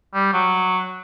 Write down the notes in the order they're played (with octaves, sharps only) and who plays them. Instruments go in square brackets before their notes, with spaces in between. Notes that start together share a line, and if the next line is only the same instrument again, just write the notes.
[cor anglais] G3
F#3